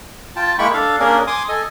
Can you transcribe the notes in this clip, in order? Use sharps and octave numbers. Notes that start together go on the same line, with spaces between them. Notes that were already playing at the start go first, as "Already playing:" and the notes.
F4 G5 A5
G#3 A#3 E4 G5 B5 C#6
D4 A4 F5
A#3 C#4 D4 G#4 A#4
G#5 C6 D6 D#6
A4 D#5 G#5